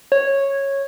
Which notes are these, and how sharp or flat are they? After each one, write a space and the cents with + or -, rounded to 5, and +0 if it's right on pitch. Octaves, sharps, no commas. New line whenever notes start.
C#5 -10